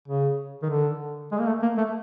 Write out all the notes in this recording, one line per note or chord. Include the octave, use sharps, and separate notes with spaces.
C#3
D#3
D3
G#3
A#3
A3
A#3
A3